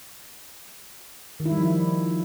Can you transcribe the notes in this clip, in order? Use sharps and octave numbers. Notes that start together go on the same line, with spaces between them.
D#3
E4
G3
F3
E4